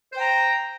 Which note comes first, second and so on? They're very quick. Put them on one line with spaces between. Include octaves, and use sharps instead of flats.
C5 G5 A#5